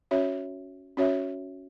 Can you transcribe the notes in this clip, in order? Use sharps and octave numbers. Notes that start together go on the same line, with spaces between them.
C#4 F#4 C#5 E5
C#4 F#4 C#5 E5